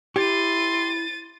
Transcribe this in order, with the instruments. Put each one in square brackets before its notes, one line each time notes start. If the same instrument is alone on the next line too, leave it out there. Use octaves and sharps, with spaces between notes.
[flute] E4 [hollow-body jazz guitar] G4 [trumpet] C6 [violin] A6 D#7